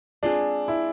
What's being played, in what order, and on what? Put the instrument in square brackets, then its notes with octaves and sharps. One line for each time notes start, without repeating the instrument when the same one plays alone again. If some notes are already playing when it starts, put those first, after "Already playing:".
[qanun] G#3 C4 F4 G#4 [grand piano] D4
[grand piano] E4